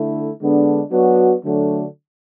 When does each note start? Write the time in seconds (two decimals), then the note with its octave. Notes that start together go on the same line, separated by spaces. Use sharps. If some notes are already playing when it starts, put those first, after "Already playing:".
Already playing: D3 A3 E4
0.40 D3 G#3 B3 D4
0.92 F#3 B3 D4 F#4
1.44 D3 F#3 A3 D4 F#4